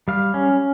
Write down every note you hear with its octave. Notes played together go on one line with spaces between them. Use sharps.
G3 F5
C#4